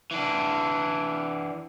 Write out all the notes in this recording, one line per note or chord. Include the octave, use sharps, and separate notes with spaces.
E3 D4